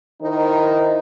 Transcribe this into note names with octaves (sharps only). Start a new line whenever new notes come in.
D#3 D#4 E4 A#4 C5